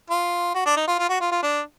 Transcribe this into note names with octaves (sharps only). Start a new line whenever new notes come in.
F4
F#4
D4
D#4
F4
F4
F#4
F4
F4
D4